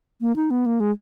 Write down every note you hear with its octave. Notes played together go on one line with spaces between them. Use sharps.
A#3
D#4
B3
A#3
G#3